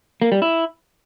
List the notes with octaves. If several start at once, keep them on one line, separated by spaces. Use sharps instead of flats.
A#3
G3
E4